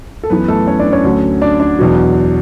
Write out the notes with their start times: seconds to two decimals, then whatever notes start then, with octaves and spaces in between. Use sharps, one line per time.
0.24 A4
0.30 F#2 E3 B3 B4
0.48 A3 A4
0.67 C#4 C#5
0.80 D4 D5
0.92 C#4 C#5
1.04 D2 D3 F#3
1.42 D4 D5
1.60 D4 D5
1.79 E2 B2 F#3